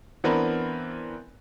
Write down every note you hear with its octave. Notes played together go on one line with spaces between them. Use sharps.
E3 B3 C4 D4 A#4 B4